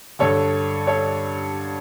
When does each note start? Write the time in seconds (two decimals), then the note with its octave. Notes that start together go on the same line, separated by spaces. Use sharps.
0.19 G2 D3 A4 C#5
0.87 A4 C#5